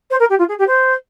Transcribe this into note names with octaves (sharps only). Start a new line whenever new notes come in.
C5
A#4
G4
F4
G#4
G4
C5